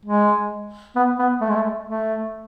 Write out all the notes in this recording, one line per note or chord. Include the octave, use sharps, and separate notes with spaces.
G#3
B3
B3
A3
G#3
A3
A3